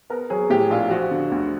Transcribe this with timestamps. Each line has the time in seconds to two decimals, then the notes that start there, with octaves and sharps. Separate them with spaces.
0.10 B3 A#4
0.30 F#3 G#4
0.50 A2 G4
0.70 A#1 F4
0.90 F3 F#4
1.11 D3
1.31 D2